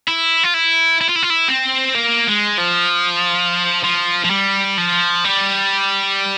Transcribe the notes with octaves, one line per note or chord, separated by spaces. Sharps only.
E4
F4
E4
E4
F4
E4
F4
E4
C4
A#3
G#3
F3
F3
F3
G3
F3
G3